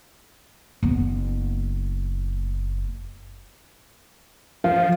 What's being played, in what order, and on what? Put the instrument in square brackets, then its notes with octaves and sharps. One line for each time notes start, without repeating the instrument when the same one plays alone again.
[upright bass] F#1 B3
[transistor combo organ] F3 [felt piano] F5